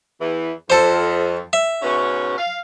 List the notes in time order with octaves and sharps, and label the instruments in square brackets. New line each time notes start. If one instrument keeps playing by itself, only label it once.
[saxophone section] E2 E3
[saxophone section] F2 [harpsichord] A4 C5
[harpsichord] E5
[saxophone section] G#2 B2 C#4
F5